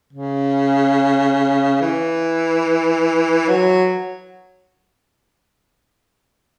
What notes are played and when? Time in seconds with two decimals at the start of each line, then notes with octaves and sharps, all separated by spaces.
0.13 C#3
1.81 E3
3.49 F#3